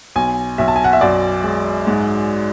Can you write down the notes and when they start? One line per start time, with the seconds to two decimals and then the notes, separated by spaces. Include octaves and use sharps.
0.16 B1 G#5
0.58 B1 E5
0.68 A5
0.76 G#5
0.84 F#5
0.93 E5
1.01 F#2 D5
1.44 G#3
1.87 G#2